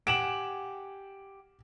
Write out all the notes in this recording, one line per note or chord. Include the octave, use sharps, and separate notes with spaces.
G4 F#5 G#5 D7 E7 F#7